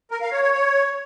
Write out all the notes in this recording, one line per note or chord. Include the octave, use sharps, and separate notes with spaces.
A#4
F5
C#5
C#5
C#5